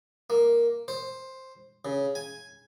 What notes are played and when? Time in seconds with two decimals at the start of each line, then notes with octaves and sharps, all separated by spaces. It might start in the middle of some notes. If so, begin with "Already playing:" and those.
0.30 A#3
0.88 C5
1.85 C#3
2.15 G#5